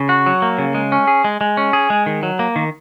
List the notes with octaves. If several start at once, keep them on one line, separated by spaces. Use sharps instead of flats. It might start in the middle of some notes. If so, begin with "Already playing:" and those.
Already playing: C#3
F#4
F#3
A#3
C#3
G#3
C#4
G#4
G#3
G#3
C#4
G#4
G#3
D#3
F#3
A#3
D#3